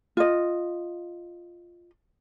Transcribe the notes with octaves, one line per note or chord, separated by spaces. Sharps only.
F4 D#5